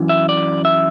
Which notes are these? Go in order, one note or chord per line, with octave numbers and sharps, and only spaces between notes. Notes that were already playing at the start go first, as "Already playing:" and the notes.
Already playing: F#2 E3
E5
D5
E5